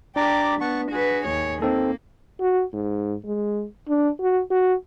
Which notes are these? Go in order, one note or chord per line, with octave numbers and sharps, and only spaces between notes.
D4 G4 D5 A#5 D6
B3 F#5 A5 C#6
F#4 G#4 B4
D#2 C#5
A#3 C4 D#4 A4
F#4
G#2
G#3
D4
F#4
F#4